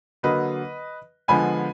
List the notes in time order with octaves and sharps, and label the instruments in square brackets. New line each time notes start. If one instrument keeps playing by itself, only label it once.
[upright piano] D3 F#3 A#3 B4 D#5
D3 F3 G#3 B3 G#5 B5